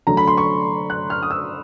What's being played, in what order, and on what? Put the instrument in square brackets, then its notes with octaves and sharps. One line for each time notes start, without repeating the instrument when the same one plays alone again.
[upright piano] D3 F#3 A3 A#5
B5
C6
C#6
F#6
F6
D#6
E6